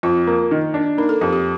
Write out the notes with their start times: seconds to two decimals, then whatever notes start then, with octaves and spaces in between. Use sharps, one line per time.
0.03 F2 F4
0.27 A#3
0.51 D#3
0.74 D4
0.98 A#3 D#4
1.09 A4
1.21 F2 G4
1.33 G4